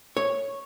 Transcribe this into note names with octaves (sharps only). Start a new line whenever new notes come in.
C#5